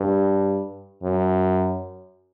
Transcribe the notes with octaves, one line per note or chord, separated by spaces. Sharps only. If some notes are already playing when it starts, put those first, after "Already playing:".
Already playing: G2
F#2